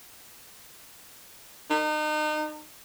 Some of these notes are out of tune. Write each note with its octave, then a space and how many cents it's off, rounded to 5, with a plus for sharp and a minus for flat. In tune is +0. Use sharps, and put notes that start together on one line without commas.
D#4 -35